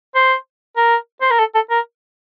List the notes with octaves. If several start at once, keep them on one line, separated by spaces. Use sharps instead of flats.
C5
A#4
C5
A#4
A4
A4
A#4